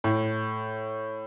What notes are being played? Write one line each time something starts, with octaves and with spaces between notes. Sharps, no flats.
A2